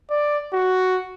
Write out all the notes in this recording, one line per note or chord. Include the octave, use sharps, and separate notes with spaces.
D5
F#4